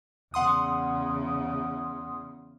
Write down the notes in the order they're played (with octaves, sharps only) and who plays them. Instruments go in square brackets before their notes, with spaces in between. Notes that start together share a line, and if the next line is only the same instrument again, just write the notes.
[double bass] E2 C#3 [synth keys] F#5 C6 D#6